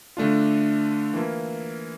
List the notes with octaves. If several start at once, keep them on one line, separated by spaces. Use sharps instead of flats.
D3 A3 D4 F4
E3 A#3 F4